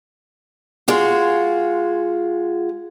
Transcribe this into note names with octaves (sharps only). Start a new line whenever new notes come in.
G#3 F4 F#4